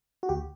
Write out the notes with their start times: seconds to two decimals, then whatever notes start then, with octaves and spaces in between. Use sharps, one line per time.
0.23 F#4
0.29 D2 G4